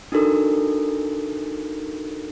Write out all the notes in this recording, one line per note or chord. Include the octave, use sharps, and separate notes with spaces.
D4 D#4 F#4 A4 A#4